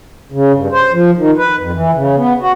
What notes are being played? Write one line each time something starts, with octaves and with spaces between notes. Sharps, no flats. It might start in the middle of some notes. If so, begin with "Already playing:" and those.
C#3
G2
C5
F3
D#3
B4
F2
E3
C#3
B3
F#4